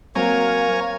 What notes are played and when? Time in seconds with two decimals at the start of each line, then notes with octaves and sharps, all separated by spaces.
0.15 F#3 A#3 C4 A#4 C#5 F5 G#5 A#5